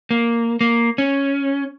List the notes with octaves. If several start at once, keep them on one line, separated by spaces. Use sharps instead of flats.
A#3
A#3
C#4